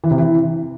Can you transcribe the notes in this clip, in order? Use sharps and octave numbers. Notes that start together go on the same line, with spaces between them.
E3
C3
E3